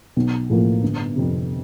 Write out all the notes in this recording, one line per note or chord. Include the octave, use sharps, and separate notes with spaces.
B1
A2 F3 A#3
G1
F2 C3